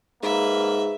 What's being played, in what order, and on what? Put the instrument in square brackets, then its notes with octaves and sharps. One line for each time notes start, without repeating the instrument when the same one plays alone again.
[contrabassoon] G#2 [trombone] A#3 [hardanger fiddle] B4 E5